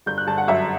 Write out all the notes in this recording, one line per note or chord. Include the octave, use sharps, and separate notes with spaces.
G1 G6
F#6
G1 A5
F#5
F#2 E5